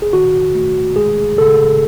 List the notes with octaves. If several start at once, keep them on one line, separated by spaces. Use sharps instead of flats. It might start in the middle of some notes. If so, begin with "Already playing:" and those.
G#4
D#3 F#4
A3
G#3 G#4
C#3 A4